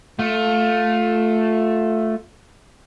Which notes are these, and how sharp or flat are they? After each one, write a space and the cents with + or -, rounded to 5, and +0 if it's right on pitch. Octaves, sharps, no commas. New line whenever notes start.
A3 +0 F4 +20